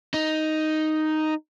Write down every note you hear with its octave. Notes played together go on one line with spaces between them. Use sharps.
D#4